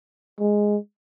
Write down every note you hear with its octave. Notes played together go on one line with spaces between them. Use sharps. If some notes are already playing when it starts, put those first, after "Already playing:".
G#3